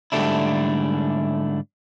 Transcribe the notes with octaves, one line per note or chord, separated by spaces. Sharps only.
G#2 D3 G3 A3 D4 E4